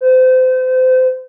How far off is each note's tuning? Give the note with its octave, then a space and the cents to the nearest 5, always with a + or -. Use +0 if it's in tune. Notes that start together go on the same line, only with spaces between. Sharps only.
C5 -30